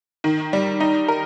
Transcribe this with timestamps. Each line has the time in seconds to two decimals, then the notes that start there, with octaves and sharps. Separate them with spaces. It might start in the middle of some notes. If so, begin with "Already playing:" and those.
0.24 D#3
0.53 G3
0.80 D#4
1.08 A#4